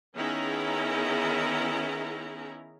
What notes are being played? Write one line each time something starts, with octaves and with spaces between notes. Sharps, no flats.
D#3 B3 C#4 E4 G#4 A#5